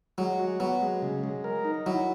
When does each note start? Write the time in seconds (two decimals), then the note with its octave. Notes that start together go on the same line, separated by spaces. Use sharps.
0.18 F#3 G#3
0.39 F#4
0.60 F#3 B3
0.82 G#3
1.02 C#3
1.24 G#3
1.44 A#4
1.65 D#4
1.86 F#3 E4